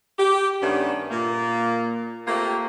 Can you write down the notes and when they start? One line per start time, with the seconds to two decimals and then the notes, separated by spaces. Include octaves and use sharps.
0.18 G4
0.61 G2 D#3 A3 B3 C#4 D4
1.10 A#2 A#3
2.27 A3 A#3 C4 F4 G4